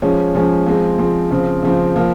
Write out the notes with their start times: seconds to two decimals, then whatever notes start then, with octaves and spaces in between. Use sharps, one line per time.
0.02 F3 G#3 C#4
0.35 F3 G#3 C#4
0.66 F3 G#3 C4
0.98 F3 G#3 C4
1.31 C#3 F3 C4
1.63 C#3 F3 C4
1.96 F3 A#3